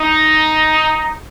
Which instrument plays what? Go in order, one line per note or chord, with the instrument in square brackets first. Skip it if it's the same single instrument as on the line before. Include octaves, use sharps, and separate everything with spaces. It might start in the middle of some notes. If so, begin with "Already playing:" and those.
Already playing: [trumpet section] D#4